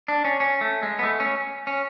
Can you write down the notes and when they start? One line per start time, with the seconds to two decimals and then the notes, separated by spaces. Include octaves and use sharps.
0.08 D4
0.25 C#4
0.40 C#4
0.61 A3
0.83 G#3
0.99 B3
1.03 A3
1.20 C#4
1.67 C#4